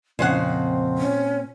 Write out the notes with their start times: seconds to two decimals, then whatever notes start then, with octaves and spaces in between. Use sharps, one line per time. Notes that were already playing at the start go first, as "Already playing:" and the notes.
0.19 F2 A#2 C#3 C4 F#5
0.98 C#4